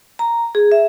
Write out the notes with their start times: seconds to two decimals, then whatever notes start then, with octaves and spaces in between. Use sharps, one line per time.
0.19 A#5
0.55 G#4
0.72 E5